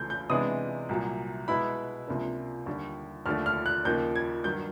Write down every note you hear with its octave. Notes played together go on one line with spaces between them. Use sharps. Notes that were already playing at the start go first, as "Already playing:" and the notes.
Already playing: C#2 C#3 E3 A3 G6
G6
C3 E3 G#3 B3 D4 D#6
C2 A#2 F#3
B2 G#3 B3 E4 B5
C#2 C3 F3 A#3 D4
D#2 D3 G3
D#2 D3 F3 A3 D4 F6
F6
F#6
D#2 C#3 F3 A#3 D#4 G6
G#6
G2 D#3 F#3 G6